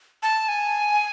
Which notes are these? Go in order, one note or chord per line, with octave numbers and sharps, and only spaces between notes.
A5
G#5